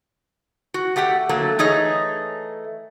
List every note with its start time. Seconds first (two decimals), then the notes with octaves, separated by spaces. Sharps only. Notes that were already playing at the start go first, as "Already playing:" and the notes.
0.74 F#4
0.96 A3 G4 F#5 G5
1.29 D3 F#3 A3 A#3
1.59 E3 A3 D#4 G#4 C#5 D#5